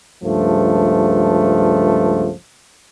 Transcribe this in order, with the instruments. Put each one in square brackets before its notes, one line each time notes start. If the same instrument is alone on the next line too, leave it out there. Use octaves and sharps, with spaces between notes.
[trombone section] C#2 G2 F3 A3